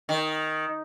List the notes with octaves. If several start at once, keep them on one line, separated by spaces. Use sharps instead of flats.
D#3